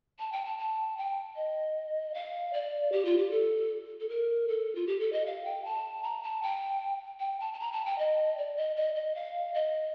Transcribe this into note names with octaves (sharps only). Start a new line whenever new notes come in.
A5
G5
A5
A5
G5
D#5
F5
D5
G4
F4
G4
A4
A4
A#4
A4
F4
G4
A4
D#5
F5
G5
A5
A#5
A5
G5
G5
A5
A5
A#5
A5
G5
D#5
D5
D#5
D#5
D#5
F5
D#5